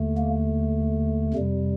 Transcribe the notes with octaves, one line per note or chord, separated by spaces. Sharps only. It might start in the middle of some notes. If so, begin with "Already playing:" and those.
Already playing: D#2 D3 A3
A#3
F2 C3 G3